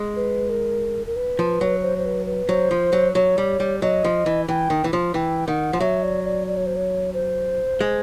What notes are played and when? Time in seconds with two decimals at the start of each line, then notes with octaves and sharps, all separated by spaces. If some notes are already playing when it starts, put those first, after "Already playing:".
Already playing: G#3
0.16 B4
0.50 A#4
1.07 A#4
1.16 B4
1.39 F3
1.61 F#3
1.82 C5
1.98 C5
2.05 B4
2.26 B4
2.49 F#3 C5
2.71 F3
2.93 F#3
3.15 F#3 C#5
3.38 G3
3.60 G3
3.82 F#3 D#5
4.04 F3
4.26 E3
4.48 E3 G5
4.70 D#3
4.84 E3
4.93 F3
5.14 E3 G5
5.48 D#3 F#5
5.73 F3
5.80 F#3 E5
6.03 D5
6.25 D5
6.47 D5
6.57 C#5
6.66 C5
6.76 C#5
7.14 C5
7.80 G#3